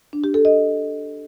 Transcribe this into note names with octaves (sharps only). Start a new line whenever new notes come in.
D4
G4
A4
D#5